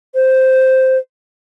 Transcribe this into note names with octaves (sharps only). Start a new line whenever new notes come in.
C5